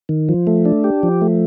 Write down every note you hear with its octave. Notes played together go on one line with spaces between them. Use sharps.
D#3
F3
A3
D4
G4
F3
A3